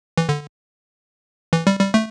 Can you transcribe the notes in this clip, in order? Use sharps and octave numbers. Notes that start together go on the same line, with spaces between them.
E3
D3
E3
G3
G3
A3